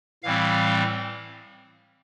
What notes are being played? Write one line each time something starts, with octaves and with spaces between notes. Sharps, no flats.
A2 E3 G3 C4 F5